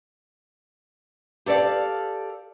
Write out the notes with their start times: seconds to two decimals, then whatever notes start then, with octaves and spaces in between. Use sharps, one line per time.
1.46 G4 A4 C#5 D5 F5